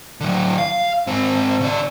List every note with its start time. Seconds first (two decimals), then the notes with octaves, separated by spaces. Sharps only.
0.20 D3 F#3
0.58 F5
1.07 G#2 C4
1.61 C#3 D5